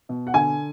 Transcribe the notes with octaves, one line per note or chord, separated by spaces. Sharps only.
B2
F#5
D3 G#5